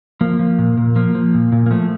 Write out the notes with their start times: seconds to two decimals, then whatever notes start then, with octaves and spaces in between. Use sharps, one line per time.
0.21 F3 A#3
0.39 F3
0.58 A#2
0.77 A#2
0.96 F3 A#3
1.15 F3
1.34 A#2
1.52 A#2
1.66 A#3
1.71 F3 A3